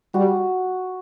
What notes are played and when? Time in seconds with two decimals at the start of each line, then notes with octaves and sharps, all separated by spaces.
0.14 G3 F#4